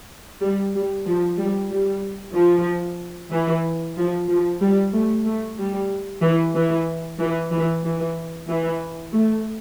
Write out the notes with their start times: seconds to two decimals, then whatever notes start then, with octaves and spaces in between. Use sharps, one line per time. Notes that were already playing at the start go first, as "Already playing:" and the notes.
0.42 G3
0.75 G3
1.06 F3
1.38 G3
1.71 G3
2.35 F3
3.32 E3
3.97 F3
4.29 F3
4.62 G3
4.93 A3
5.26 A3
5.58 G3
6.22 E3
6.55 E3
7.20 E3
7.52 E3
7.84 E3
8.49 E3
9.13 A3